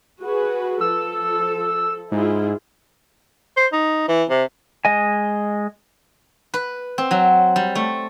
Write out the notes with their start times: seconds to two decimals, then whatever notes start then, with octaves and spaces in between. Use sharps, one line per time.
0.22 F#4 G#4 B4
0.81 F3 A4 E6
2.12 G#2 E4 F4 G#4
3.57 C5
3.73 D#4
4.08 E3
4.29 C3
4.85 G#3 D#5 G#5
6.54 B4
6.98 C4
7.11 F#3
7.56 G3
7.75 A3